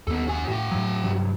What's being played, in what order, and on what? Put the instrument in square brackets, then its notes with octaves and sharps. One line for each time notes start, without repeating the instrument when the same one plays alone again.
[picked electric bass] D#2 [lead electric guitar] B3 A4
[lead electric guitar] F#4 G#5
[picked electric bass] A2 [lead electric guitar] F#4 G5
[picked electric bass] A2 F#3
G2 C3 F#3